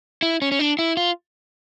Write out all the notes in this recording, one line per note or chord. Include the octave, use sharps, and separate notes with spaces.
E4
C#4
C#4
D4
E4
F4